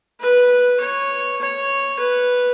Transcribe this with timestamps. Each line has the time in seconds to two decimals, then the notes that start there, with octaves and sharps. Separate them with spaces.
0.21 B4
0.81 C#5
1.41 C#5
2.00 B4